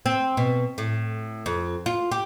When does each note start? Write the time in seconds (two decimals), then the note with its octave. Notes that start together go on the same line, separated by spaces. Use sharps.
0.06 C4
0.37 B2
0.78 A2
1.46 F2
1.86 F4
2.11 G4